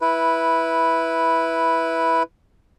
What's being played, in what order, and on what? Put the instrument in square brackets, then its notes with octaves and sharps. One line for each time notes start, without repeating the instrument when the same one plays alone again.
[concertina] E4 B4